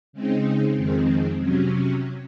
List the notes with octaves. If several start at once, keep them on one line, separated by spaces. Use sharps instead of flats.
C#3 G#3 C4 D#4
F2 D#3 G#3 C4
C3 F#3 C#4